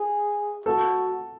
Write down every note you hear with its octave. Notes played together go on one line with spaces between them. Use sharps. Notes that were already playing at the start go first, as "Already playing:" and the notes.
Already playing: G#4
F#4 A4